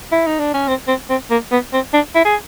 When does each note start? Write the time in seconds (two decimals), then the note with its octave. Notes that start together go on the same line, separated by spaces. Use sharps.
0.12 E4
0.27 D#4
0.40 D4
0.54 C#4
0.68 C4
0.88 C4
1.10 C4
1.31 A#3
1.52 B3
1.73 C4
1.94 D4
2.15 E4
2.25 G#4